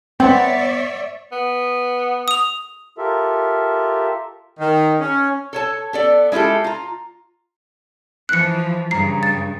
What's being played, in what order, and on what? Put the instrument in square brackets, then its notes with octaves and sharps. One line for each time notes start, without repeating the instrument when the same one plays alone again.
[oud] B3 [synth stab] C4 [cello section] C#5 D5 E5
[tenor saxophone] B3
[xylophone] D#6 F7
[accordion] F4 G4 A4 A#4 E5
[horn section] D#3
C#4
[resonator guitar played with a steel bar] A4 C#5 A5
B3 A4 D5
G#3 E4 F4 G4 A4
F4 A#5
[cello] E3 F3 [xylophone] F#6 C#7
[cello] G2 C#3 [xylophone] A#5 C7
[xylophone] A6